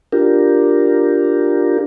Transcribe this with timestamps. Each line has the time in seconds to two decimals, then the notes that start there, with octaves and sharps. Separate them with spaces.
0.13 D4 F4 G4 A#4